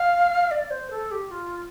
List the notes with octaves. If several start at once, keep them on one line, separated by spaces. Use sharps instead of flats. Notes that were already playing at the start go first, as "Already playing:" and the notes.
Already playing: F5
D5
C5
A4
G4
F4